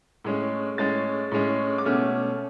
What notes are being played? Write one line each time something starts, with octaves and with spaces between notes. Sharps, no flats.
A2 G#3 C#4
A2 G#3 C#4 A6
A2 G#3 C#4
D6
B2 A3 C#4 F6